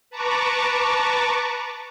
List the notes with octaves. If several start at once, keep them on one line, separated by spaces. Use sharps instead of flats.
B4 A5 A#5 C#6 D6